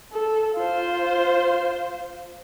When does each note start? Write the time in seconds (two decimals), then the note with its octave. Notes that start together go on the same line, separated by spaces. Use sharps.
0.12 A4
0.55 F4 C5